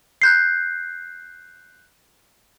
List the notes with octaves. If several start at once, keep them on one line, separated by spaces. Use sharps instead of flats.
F#6 G6 C7